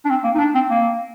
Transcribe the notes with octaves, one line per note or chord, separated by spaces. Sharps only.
D4
C4
A#3
D#4
D4
C4
A#3